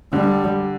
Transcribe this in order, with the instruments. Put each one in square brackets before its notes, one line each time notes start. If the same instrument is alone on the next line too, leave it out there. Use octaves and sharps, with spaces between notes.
[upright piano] D3 [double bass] G3